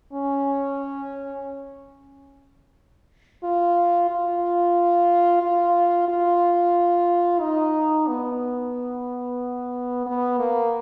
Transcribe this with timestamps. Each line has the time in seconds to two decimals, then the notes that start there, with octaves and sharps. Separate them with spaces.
0.13 C#4
3.44 F4
4.10 F4
5.42 F4
6.09 F4
7.41 D#4
8.08 B3
10.06 B3
10.39 A#3